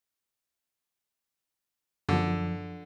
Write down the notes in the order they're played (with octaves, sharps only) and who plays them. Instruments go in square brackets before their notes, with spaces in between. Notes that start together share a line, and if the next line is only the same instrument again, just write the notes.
[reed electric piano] F#2 F3 [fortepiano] D3